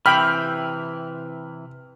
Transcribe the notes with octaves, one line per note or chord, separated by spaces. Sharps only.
C3 E3 G5 B5 F6